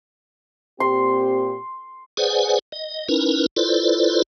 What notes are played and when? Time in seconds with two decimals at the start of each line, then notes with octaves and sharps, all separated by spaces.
0.80 A#2 C4 G4 C6
2.17 G#4 B4 C5 D5 F#5 G#5
2.72 D#5
3.09 C#4 D#4 E4 A#4 B4
3.56 E4 F4 A4 B4 C5 D5